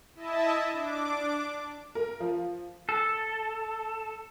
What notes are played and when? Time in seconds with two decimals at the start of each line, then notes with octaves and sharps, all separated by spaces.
0.15 E4 D#5 E5 A5
0.72 D4 D6
1.95 A#4
2.20 F3
2.89 A4